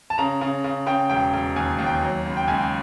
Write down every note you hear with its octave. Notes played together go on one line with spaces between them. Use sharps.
A5
C#3 A#5
C#3
C#3
C#3 G5
E1 G5
E1
D#2 G#5
D#2
G5
F#3
C#2
G5
C#2 G#5